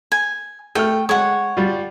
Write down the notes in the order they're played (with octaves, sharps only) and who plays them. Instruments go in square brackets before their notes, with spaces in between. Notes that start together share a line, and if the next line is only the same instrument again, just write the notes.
[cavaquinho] G#5
[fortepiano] A3 F6 [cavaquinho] G5
[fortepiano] G#3 [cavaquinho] C#5 F#5
[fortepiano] G3 F4